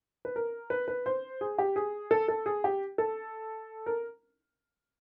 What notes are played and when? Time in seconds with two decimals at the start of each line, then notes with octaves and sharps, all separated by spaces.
0.25 B4
0.36 A#4
0.70 B4
0.88 B4
1.06 C5
1.41 G#4
1.58 G4
1.76 G#4
2.11 A4
2.28 A4
2.46 G#4
2.64 G4
2.98 A4
3.86 A#4